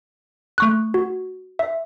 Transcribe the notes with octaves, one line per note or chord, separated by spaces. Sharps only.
A3 C#6 F#6
F#4
E5